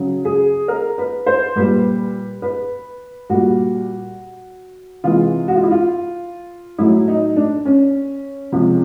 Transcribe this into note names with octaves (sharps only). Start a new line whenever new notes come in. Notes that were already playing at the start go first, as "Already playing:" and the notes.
Already playing: C#3 F#3
G#4
A#4
B4
C5
A#2 G3 B4
B4
A#2 G3 F#4
C3 E3 G#3 F4
F#4
F4
E4
F4
A2 F#3 E4
D#4
D4
C#4
C3 F3 G#3